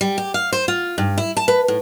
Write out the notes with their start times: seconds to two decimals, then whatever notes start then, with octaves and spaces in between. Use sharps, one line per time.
0.01 G3
0.18 G4
0.34 F5
0.52 C5
0.68 F4
0.98 G2
1.18 E4
1.37 A5
1.48 B4
1.68 A2